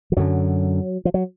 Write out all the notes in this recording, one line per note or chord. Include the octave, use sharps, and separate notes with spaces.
F3
F#2 D3 F#3
F3
F#3